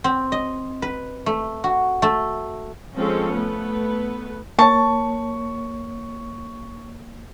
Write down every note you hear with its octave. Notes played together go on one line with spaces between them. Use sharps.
C4
D#5
B4
A3
F#4
A3
F3 G#3 C4 C#4 A4
A3 B3 B4
A#3 C#5 A5 C#6